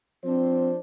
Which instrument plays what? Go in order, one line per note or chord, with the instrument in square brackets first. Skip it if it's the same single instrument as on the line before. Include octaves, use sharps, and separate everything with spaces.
[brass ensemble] F3 D4 C5 [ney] C4